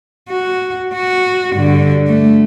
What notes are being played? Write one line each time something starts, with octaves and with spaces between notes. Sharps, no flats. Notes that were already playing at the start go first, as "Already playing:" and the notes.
F#4
F#4
G2 D3
A3